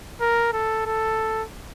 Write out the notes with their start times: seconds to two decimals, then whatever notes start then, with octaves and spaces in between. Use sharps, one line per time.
0.21 A#4
0.53 A4
0.86 A4